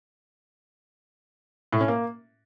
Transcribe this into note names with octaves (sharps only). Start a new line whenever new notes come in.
A2
C#4
A#3